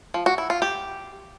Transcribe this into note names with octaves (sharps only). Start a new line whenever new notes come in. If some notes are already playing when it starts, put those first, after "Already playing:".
F3
F#4
E4
F4
G4